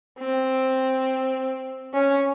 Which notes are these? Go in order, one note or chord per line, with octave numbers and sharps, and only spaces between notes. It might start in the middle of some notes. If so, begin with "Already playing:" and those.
C4
C#4